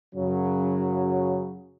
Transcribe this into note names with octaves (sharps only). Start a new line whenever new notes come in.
F#2 C#3 F#3